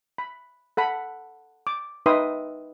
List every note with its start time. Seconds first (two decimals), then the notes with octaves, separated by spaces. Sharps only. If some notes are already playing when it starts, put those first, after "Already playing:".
0.18 B5
0.77 A4 F#5 B5
1.67 D6
2.06 D#4 B4 E5 G5 C6 D#6